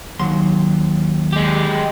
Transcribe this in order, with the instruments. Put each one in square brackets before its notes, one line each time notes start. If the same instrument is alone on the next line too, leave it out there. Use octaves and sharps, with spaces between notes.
[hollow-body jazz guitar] D#2 F#3 C6
[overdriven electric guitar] G#3 G4